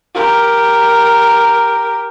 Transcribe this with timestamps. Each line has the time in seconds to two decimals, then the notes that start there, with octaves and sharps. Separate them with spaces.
0.15 G4 A#4